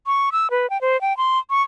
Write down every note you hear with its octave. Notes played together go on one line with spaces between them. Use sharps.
C#6
E6
B4
G5
C5
G5
C6
C#6